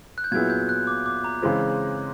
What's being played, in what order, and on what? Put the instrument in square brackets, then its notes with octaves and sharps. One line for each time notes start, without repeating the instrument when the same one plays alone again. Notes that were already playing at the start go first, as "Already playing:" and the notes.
[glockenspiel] F#6
G6
[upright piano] A#2 F#3 B3 E4 G#4 [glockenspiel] G#6
[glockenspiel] G6
F#6
D6
D6
A#5
[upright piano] C#3 E3 G#3 C4